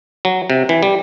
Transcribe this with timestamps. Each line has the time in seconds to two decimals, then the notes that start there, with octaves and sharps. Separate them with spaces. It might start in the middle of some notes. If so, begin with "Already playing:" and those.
0.25 F#3
0.50 C3
0.69 E3
0.83 G3